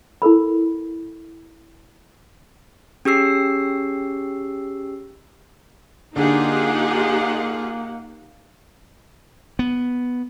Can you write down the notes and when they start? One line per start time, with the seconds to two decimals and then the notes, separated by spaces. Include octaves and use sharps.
0.22 E4 A4 A#4 B5
3.05 C#4 G4 G#4 E6 C7
6.16 D3 A#3 D#4 F4 G4 G#4 F#5
9.59 B3